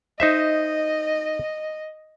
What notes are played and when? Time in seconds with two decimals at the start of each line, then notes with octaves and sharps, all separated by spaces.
0.20 D#4 C5 D#5 E5